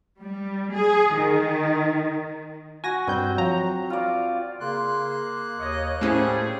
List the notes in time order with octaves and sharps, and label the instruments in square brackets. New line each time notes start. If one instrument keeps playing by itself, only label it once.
[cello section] G3
G#4
D#3
[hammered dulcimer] F#4 [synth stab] G#5 A#6
[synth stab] G2 G3 G6 [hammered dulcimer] C4
[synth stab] F3 F#3 A#5
[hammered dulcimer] F4 D5
[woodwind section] C#3 C6 [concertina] A#3 F#6
[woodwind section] D#2 [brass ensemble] C#5 D#5
[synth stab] A2 C#4 [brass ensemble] G3 A3 G#4 [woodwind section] G4 C5